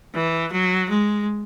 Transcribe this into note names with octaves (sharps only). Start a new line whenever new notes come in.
E3
F#3
G#3